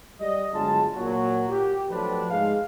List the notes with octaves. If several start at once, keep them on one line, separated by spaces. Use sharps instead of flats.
G3 G4 D5 D#5
G1 F#3 G#3 F4 A5
A#2 F#3
G4
F3 F#3 A3 C4 D4 B4
G#2 G#3 G#4 F5